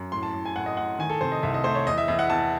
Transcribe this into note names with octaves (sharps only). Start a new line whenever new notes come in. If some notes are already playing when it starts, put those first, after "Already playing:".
Already playing: F#2
A2 C6
A5
A2
G#5
A2 F#5
D#5
A2 F#5
D#3 G#5
A4
C3 C5
D#5
C2 E5
D#5
A3 C5
C#5
E2 D#5
E5
E2 E5
F#5
E2 A5